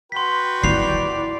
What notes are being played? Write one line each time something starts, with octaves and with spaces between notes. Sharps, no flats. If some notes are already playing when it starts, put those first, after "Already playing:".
F#4 B4 G5 C6 B6
E4 D5 C7 F7